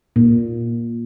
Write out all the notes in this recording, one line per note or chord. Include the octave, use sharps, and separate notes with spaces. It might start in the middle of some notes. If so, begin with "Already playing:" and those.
A#2